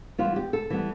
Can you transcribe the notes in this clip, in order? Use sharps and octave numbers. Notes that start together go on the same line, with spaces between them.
E3 G3 B3 F4
G4
A4
E3 G3 B3